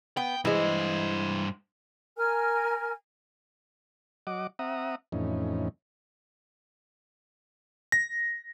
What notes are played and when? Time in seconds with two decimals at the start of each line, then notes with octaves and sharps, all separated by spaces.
0.17 B3 G5
0.45 G2 E3 G#3 C5
2.17 A#4 G#5 F6
4.27 F#3 D#5 F#5 D6
4.59 C4 E5 F#5 A#5 D#6
5.12 F2 A2 E3 C#4 D#4
7.92 A#6